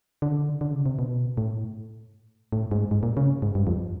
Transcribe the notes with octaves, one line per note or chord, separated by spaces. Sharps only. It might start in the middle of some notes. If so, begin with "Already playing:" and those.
D3
D3
C#3
C3
B2
A2
A2
G#2
G#2
A#2
C#3
G#2
G2
F2